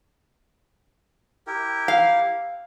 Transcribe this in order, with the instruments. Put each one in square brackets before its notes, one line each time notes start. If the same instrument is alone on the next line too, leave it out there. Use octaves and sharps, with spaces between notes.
[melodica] E4 G4 A#4
[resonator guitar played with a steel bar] F5